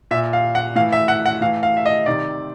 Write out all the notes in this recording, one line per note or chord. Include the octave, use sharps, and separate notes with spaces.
A#2 E5
F5
F#5
A2 E3 F5
E5
F#5
F#5
A2 E3 F5
F5
E5
D#5
C3 D#3 D5